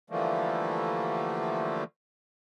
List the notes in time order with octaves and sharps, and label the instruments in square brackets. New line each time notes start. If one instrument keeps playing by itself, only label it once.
[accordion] D3 E3 F3 G3 A3 A#3